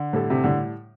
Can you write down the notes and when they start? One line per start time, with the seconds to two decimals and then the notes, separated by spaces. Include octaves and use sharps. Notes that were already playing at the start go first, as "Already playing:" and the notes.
Already playing: D3
0.13 A2 G3 E4 A4
0.30 C3
0.44 A2 D3 G3